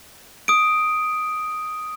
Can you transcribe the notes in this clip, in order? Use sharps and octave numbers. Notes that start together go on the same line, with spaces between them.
D#6 D7